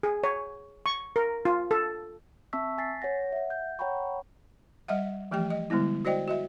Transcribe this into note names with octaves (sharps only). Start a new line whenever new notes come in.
G#4
C#5
C#6
A#4
F4
A4
C4 E5 A5 C#6 E6 B6
G#5 A6 B6 C7
C#5 F#5 A#6
E5 F#5
G6
C#5 F#5 G5 A#5 B5 C#6
G3 D#5 E5 F#5
E3 F3 A3 G4 G5
D#5
D3 G3 G#3 B3 E4
F#4 C5 D5 D#5 G5
F#4 D#5 E5